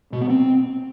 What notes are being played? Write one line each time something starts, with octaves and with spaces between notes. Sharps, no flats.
B2
B3
C4